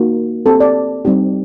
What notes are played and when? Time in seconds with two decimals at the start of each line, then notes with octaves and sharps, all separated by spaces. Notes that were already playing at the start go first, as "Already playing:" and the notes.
Already playing: A#3 D#4 F#4
0.46 C4 G4 A4
0.60 D5
1.05 G3 C4 D#4 G4